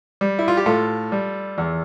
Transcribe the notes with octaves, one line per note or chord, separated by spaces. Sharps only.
G3
E4
F4
G4
A2 F4 A4
G3
E2